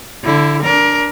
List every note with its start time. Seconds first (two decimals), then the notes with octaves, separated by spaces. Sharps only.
0.24 D3 E4
0.62 D4 A#4